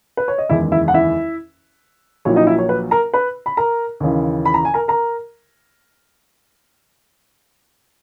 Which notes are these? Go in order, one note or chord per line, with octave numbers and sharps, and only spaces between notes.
B4
C#5
D#5
F#1 E2 D#3 G#3 E4 E5
E4 E5
F#5
E4 E5
A#1 A#2 F#3 A#3 E4 C#5
D#4 D#5
E4 E5
C#5
B4
A#4 A#5
B4 B5
B5
A#4 A#5
D#2 C#3 E3
B5
A#5
G#5
A#4 A#5
A#4 A#5